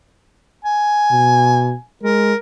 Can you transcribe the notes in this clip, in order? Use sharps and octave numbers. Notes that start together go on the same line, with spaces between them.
G#5
B2
G#3 A#4